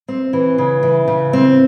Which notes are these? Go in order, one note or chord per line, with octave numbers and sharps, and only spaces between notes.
C4
E3
C#3
E3
C#3
C4